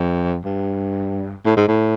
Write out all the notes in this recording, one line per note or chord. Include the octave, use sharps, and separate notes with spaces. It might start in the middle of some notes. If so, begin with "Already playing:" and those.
Already playing: F2
G2
A2
G#2
A2